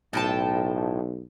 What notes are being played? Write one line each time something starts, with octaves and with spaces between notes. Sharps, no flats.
B1 A2 G5 A5